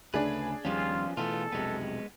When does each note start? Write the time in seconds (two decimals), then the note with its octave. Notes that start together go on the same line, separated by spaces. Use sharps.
0.14 D2 C#3 A3 D4 G#4 B4
0.65 D#2 F3 G3 B3 C#4 F4
1.17 B2 E3 A3 B3 F4 A4
1.52 F1 B1 C3 G#3 B3